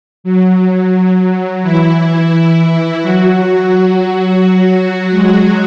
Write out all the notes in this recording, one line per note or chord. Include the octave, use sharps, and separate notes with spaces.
F#3
E3 E4
F#3 F#4
F#3 F#4
G#3